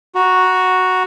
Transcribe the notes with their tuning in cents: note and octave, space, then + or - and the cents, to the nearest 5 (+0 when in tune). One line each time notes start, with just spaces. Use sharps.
F#4 +0 A#5 +25